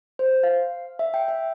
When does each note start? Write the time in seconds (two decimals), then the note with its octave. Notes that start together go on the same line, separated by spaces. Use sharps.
0.19 C5
0.43 F5
0.99 E5
1.14 G5
1.28 E5